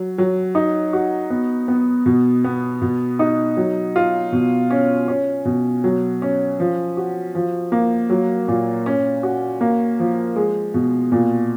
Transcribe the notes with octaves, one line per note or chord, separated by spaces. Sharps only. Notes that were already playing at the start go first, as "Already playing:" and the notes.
Already playing: F#3
F#3
D#4
F#4
B3
B3
B2
B3
B2
D#4
F#3
F4
B2
C#4
C#4
B2
F#3
C#4
F3
F#4
F3
A#3
F#3
A#2
C#4
F#4
A#3
F3
G#3
B2
A#2